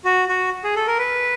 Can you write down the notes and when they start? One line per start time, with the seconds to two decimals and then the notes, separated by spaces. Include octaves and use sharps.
0.05 F#4
0.29 F#4
0.64 G#4
0.76 A4
0.87 A#4
0.98 B4